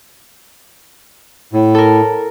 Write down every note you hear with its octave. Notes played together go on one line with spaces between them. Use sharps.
A2
A4 A#4